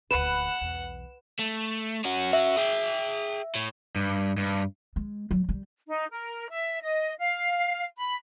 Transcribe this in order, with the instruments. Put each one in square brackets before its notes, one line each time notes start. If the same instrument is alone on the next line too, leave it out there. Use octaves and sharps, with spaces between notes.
[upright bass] D#1 D2 [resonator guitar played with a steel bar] B4 [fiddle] F#5 [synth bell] E7
[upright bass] B1 E2
[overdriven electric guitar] A3
C#4 F#4
[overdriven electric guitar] C#4 F#4 [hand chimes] E5
[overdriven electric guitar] G#4 G5
A2
G2
G2
[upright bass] G#3
F#3
G3
[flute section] D#4
A#4
E5
D#5
F5
B5